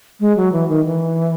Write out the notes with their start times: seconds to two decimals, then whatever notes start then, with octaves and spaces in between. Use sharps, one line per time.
0.20 G#3
0.37 F#3
0.52 E3
0.69 D#3
0.85 E3